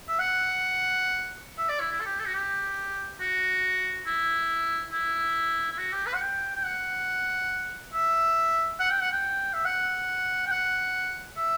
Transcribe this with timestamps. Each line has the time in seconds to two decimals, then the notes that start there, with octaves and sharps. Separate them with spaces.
0.08 E5
0.19 F#5
1.58 E5
1.69 D5
1.80 E4
1.91 E4
2.01 A4
2.06 G4
2.19 A4
2.27 F#4
2.34 G4
3.20 F#4
4.06 E4
4.91 E4
5.72 E4
5.78 F#4
5.92 G4
6.07 B4
6.14 F#5
6.21 G5
6.56 G5
6.64 F#5
7.93 E5
8.80 F#5
8.90 G5
9.01 F#5
9.12 G5
9.53 E5
9.65 F#5
10.47 G5
10.51 F#5
11.37 E5